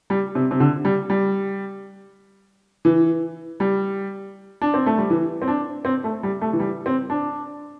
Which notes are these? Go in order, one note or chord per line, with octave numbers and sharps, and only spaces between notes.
G3
C3
C3
D3
G3
G3
E3
G3
D4
C4
A3
G3
E3
C4
D4
C4
A3
G3
A3
E3
G3
C4
D4